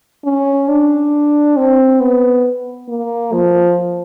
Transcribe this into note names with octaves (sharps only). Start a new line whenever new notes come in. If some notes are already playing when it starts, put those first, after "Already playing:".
C#4
D4
C4
B3
A#3
F3